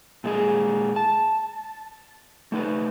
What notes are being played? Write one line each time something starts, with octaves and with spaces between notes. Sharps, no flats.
A#2 G#3 G#4
A5
A3 D#4 B4